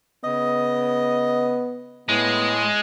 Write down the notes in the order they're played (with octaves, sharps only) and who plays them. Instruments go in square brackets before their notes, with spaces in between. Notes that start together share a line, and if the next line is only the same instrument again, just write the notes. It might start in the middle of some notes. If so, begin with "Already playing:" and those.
[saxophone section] C#3 D#5 [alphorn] B3
[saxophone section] A2 [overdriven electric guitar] G#3 [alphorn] B3